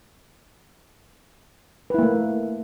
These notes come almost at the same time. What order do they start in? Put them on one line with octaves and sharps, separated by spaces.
B4 E4 A#3 A3